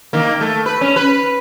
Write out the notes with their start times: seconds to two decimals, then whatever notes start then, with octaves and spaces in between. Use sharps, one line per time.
0.13 D#3 A#3
0.41 A3
0.66 B4
0.81 C#4
0.96 B4